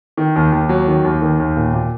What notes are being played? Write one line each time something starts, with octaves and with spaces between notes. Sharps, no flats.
D#3
D#2
D#2
F#3
D#3
D#2
D#3
D#2
A#2
A#2